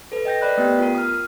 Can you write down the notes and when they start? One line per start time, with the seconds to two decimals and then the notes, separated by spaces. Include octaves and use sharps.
0.12 A4 B4
0.25 D#5 G5 G6 A#6
0.42 A#4 B4 D5 B5 F#6
0.57 A3 B3 G4 G5
0.79 F4 A#4
0.95 D#6 F6